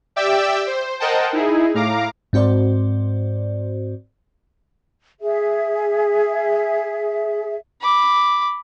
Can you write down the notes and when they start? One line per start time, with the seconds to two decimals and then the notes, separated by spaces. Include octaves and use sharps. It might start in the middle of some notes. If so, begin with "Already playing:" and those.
0.16 G4 D5 E5 G5 D6 E6
0.67 C5
1.00 A#4 C5 D#5 F#5 G5 A5
1.33 D#4 E4 G#4
1.74 A2 F5 A#5 D6
2.33 G#2 C4 F#4 C5 D5
5.21 G#4 E5
7.81 B5 D6